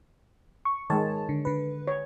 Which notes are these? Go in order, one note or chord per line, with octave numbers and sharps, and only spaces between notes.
C#6
D#3 G#3 C#5 A5
D3
D3 B4
C#5